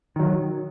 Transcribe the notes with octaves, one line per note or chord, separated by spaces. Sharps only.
D#3 F#3